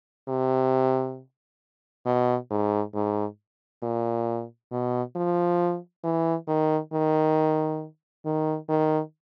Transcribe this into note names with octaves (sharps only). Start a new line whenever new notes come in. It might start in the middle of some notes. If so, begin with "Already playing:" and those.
C3
B2
G#2
G#2
A#2
B2
F3
E3
D#3
D#3
D#3
D#3